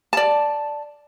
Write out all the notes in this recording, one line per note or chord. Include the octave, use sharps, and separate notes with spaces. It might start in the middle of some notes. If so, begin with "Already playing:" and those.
D5 A5